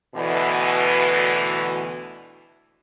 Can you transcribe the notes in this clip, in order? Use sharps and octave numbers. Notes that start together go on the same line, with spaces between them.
D2 B2 E3